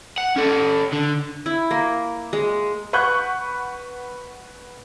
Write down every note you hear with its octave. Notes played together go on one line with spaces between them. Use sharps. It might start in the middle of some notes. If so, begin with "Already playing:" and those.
F#5
C#4 A4
D3
E4
A#3
G#3
B4 F#5 C#6 F#6 G6